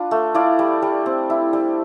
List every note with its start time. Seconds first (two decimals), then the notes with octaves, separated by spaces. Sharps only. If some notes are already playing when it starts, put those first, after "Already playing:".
Already playing: D4 F4 B4
0.11 A3
0.34 E4 D5 F5
0.59 G3
0.82 G3
1.06 C4
1.30 E4
1.53 G3